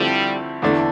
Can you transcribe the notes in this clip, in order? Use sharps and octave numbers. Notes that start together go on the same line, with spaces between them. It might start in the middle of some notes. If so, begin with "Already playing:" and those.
Already playing: D3 F3 G3 A3 C4 E4
E2 D3 A3 D4